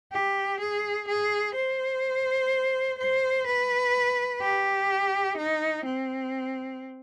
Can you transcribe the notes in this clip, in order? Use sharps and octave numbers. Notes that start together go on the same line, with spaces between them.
G4
G#4
G#4
C5
C5
B4
G4
D#4
C4